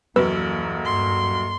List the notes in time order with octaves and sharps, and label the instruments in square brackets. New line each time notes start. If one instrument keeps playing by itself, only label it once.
[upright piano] D#1 F#2 [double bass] E3 A#3 [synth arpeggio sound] B4 E6
[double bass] G2 [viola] C6